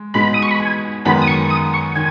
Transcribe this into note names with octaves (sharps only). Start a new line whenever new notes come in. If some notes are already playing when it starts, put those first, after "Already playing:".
Already playing: G#3
B2 G#3 D#4 B5
D#6
C#6
B5
G#5
F#2 D#3 G#3 B3 B5
D#6
C#6
D#6
C#6
D#3 G#5